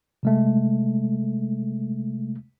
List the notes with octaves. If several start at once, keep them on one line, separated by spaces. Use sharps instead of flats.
C3 G#3 A3